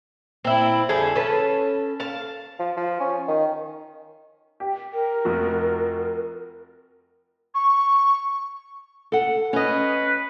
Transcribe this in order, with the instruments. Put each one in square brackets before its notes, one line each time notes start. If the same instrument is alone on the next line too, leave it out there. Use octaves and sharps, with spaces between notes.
[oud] A#2 [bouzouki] C4 E4
[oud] F2 D3 G3 [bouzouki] G#4 A4
[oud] C#4 A4 B4 [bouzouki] A5
[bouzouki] F5 A5
[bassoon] F3
F3
C#4
D#3
[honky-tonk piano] G4
[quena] A#4
[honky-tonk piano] F1 F3 F#4
[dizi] C#6
[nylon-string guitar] A4 F#5
[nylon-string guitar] C#4 D#5 [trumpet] B4